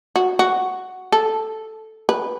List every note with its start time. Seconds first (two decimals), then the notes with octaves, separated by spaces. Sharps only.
0.16 F#4
0.39 F#4
1.12 A4
2.09 B4